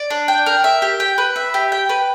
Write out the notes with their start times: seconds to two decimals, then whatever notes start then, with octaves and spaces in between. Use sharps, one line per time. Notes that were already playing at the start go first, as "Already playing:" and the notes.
Already playing: D5
0.10 D4
0.28 G5
0.46 A#4
0.64 E5
0.82 G4
1.00 G5
1.18 B4
1.36 E5
1.54 G4
1.72 G5
1.89 B4